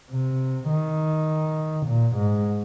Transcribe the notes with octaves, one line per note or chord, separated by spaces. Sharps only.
C3
D#3
A#2
G#2